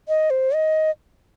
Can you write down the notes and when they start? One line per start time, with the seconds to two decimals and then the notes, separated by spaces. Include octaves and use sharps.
0.08 D#5
0.30 C5
0.54 D#5